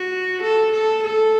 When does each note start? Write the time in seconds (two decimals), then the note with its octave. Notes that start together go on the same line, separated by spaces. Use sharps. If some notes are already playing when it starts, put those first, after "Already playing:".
Already playing: F#4
0.43 A4
0.72 A4
1.04 A4